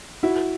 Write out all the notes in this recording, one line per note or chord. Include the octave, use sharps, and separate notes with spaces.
E4 F#4